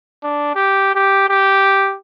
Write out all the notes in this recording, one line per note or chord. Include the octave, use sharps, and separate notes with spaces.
D4
G4
G4
G4